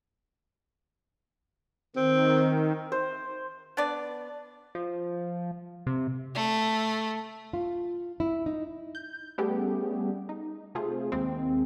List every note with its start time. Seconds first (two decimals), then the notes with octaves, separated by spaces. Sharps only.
1.96 D#3 C4
2.92 C5
3.77 B3 D4 B4 D5
4.75 F3
5.87 C3
6.35 A3
7.53 F4
8.20 E4
8.46 D#4
8.95 G6
9.38 G3 A3 B3 C#4 G4 G#4
10.29 D#4
10.75 C3 A3 F4 G#4 C5
11.12 D#2 G#3 A#3 C4